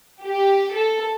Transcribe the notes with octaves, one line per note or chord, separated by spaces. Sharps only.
G4
A4